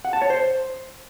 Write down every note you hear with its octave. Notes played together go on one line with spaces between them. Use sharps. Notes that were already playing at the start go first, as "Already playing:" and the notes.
F#5
A5
C#5
C5